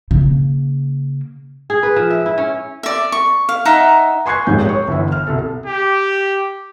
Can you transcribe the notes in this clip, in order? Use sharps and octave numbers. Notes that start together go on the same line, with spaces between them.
C#3 A#3
G#4
B4
F3
E5
E4
C#4
D5 E5
C#6
F5
D#4 E5 F#5 A#5
G#5 C6 C#6 F#6 G#6 C7
D#1 D#2 G#2 G6
C#5 C#6
G1 E3 E5
F6
C2 B2 A4
G4